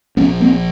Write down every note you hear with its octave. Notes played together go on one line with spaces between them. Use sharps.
A#1 A#2 B3 C#4
A#3 C4